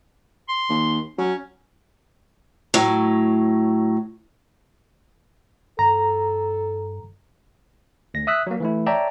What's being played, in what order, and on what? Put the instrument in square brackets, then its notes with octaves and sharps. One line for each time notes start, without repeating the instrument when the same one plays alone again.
[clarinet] C6
[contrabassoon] D#2
[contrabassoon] F#3 [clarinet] C#4
[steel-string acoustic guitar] A2 F#3
[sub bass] G2 [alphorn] A4 [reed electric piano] A#5
[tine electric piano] D2 A#6
E5 D#6 E6 F#6 B6
F#3 A#3
E3 A3 E4
C#5 D5 E5 G5 A5 A#5